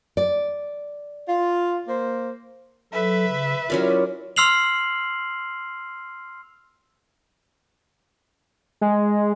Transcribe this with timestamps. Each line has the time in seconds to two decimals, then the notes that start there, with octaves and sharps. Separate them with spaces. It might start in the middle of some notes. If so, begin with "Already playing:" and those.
0.17 D5
1.29 F4
1.88 A#3 C5
2.93 F#3 A4 B4 E5
3.27 C#3
3.70 F#3 C#4 E4 F4 A#4 D5
4.36 C6 E6 F6 C7 F7 F#7
8.81 G#3